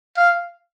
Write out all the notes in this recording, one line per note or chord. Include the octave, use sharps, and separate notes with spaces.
F5